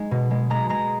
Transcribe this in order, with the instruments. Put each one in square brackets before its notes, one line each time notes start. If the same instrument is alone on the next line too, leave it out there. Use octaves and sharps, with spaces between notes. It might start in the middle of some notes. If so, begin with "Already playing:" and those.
Already playing: [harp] G#3 D#4
B2
G#3
G#3 A#5
G#3 A#5